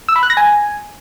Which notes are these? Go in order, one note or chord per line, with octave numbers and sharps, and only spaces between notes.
E6
B5
F#6
A#6
G#5